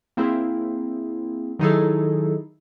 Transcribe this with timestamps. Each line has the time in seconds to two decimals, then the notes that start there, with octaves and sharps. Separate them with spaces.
0.17 A#3 C4 E4 G#4
1.59 D#3 F#3 D#4 E4 G#4 A4